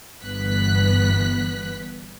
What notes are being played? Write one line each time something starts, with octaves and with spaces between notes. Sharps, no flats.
G1 G2 E3 B3 F#6 B6